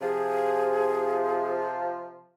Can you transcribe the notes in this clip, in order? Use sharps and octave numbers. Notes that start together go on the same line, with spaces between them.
C3 F3 G#4